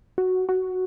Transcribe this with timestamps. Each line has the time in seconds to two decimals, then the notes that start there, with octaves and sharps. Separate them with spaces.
0.18 F#4
0.49 F#4